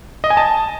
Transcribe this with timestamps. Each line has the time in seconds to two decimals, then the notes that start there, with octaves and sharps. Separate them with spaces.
0.24 D#5
0.30 G#5
0.37 A5